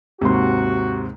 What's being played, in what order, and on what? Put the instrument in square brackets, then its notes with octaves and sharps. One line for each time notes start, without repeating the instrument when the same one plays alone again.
[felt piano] D#2 G#2 [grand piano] C3 C6 [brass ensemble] F#4